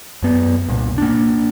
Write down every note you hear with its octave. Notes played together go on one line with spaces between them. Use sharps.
F#2 B3
C2 A#2
A#3 D4